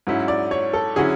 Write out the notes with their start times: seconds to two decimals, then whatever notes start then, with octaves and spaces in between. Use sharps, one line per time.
0.07 G#2 F#3 C#4 E4
0.28 D5
0.51 C#5
0.73 A4
0.96 D3 F#3 C#4 E4 G#4